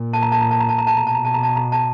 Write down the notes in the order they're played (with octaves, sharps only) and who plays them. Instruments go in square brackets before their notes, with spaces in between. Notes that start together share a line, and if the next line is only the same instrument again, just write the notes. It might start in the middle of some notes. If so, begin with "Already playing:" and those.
Already playing: [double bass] A#2
[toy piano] A5
A#5
A5
A#5
A5
A#5
A5
A#5
A5
[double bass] B2 [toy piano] A#5
[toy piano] A5
A#5
A5
A#5
A5
A#5
A5